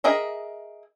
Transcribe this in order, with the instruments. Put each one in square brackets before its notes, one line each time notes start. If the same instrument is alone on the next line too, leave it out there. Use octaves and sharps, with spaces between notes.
[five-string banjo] G#4 A#4 D#5 E5